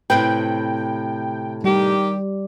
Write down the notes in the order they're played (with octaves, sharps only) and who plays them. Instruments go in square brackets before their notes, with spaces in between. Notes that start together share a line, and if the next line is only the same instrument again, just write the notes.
[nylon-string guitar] A2 C3 B4 [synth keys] G5
[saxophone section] D#3 G4 [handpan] G3